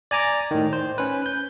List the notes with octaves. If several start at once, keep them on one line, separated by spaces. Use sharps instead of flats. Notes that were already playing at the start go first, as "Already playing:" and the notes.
D5 G#5 A#5 D6
A2 D#3
C5
C#4 B4
G6